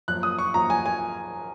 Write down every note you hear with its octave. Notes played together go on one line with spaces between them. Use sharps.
F#2 F3 A#3 F#6
D#6
C#6
F#2 F3 A#3 A#5
G#5
G#5